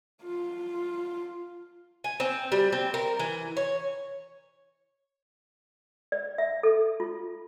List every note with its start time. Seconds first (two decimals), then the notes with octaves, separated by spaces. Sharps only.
0.23 F4
2.04 G#5
2.20 C4
2.52 G3
2.72 C4
2.94 A#4
3.19 E3
3.57 C#5
6.12 D5
6.38 E5
6.63 A4
7.00 F4